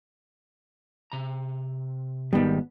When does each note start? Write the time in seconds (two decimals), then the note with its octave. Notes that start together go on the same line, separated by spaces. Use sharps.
1.12 C3 A#5
2.33 G#1 B2 D#3 G3 B3